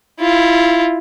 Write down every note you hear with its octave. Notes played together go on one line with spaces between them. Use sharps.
E4 F4